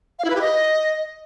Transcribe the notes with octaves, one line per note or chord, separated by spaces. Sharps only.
F5
E4
B4
G4
D#5